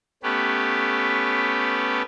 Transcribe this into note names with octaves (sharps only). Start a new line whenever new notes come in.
A3 B3 C#4 G4 B4